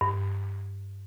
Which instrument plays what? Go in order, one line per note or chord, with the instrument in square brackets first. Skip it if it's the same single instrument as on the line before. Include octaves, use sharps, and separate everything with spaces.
[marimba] G2